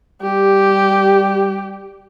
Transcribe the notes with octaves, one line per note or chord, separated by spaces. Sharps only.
G3 G4